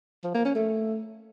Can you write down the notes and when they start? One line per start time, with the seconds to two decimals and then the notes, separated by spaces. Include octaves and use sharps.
0.24 F3
0.34 A#3
0.45 C#4
0.55 A3